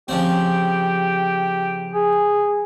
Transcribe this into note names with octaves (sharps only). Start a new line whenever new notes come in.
C#3 F3 C4 G4
G#4